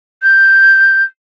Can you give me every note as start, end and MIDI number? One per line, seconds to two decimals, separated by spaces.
0.22 1.04 91